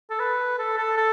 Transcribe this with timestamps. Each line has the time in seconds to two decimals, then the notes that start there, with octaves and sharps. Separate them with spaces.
0.10 A4
0.20 B4
0.59 A4
0.78 A4
0.97 A4